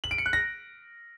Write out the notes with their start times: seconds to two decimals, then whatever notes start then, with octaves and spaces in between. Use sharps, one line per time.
0.04 F#7
0.11 D7
0.18 C#7
0.26 F#6
0.33 A#6